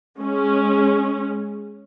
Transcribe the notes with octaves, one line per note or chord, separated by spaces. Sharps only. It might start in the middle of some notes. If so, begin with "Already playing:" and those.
G#3 C#4